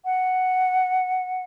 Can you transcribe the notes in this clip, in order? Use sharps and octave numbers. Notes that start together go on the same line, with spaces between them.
F#5